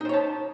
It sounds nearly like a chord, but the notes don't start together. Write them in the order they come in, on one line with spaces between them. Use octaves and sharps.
D#4 C5 C#5 A5